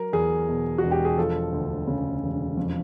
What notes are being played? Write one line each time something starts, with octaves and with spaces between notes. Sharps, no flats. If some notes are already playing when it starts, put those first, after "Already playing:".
Already playing: F#3 A#4
E2 G#4
B2
E1 F#4
G4
G#4
F3 A4
D2
C#3
E1
F2